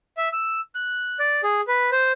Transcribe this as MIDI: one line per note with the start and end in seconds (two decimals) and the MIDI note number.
0.17 0.29 76
0.33 0.60 88
0.75 1.18 90
1.19 1.41 74
1.43 1.61 68
1.68 1.90 71
1.92 2.12 72